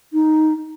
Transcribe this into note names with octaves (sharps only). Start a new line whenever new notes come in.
D#4